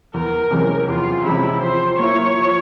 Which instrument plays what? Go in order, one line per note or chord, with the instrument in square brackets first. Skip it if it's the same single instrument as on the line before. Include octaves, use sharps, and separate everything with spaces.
[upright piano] E2 [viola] A#4
[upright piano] C3 E3 G#3 C#4
[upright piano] E2 [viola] F4
[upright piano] C3 E3 G#3 C#4 [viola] E4
[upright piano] F3 [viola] C5
[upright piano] A#3 E4 [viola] C#5
[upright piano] F3